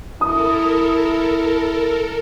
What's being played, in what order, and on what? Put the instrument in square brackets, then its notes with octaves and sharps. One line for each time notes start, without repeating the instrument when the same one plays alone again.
[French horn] E4 [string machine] A4 A#4 [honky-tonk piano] D#6